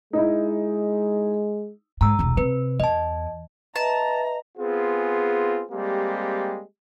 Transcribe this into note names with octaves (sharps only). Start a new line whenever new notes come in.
G#3 D#4 E4
G#2 A#5 E6
E1 C2
C3 B4
E2 D#5 A5
B4 D#5 E5 A5 A#5
B3 C4 F4 G#4
G3 G#3 A#3 C4 G4